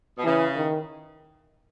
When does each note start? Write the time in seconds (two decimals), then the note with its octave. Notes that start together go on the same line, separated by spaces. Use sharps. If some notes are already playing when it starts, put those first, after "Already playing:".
0.18 B2
0.24 C#3 E3
0.56 D#3